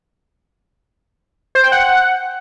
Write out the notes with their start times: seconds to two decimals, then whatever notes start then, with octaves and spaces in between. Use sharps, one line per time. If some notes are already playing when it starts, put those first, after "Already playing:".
1.55 C5
1.64 G5
1.72 F#5